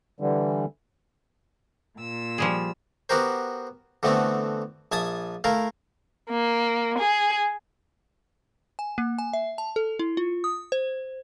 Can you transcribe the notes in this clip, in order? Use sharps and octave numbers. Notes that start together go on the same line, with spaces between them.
D3 E3 G3
A#2 E6
F3 G3 G#4
B3 F#4 G4 A#4 C5
D3 E3 A3 B3 C4 F#4
A#1 E5 G#5 A5 D#6
A3 E4 A#4 F5
A#3
G#4
G#5
A#3
G#5
E5
A5
A4
E4
F4
D#6
C5